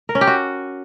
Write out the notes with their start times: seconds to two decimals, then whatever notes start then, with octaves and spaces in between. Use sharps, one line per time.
0.09 A#4
0.15 C#4
0.21 G4
0.27 F#4